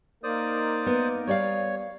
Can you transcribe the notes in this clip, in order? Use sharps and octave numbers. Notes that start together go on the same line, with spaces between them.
A#3 D#4 A#4 C5 D5 D#6
B3
G3 C#5 D5 F5